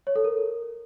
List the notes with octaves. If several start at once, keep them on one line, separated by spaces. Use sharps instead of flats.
C#5
A4
A#4